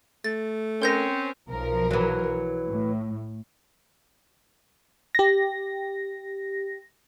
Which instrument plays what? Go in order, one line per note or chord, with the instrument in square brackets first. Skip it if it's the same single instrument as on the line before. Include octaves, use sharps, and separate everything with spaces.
[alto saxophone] A3 [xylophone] A6
[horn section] C4 C#4 [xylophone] A#4 G6 A#6
[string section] B1 F3 A#4
[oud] E3 F#3
[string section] A2
[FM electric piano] G4 A#6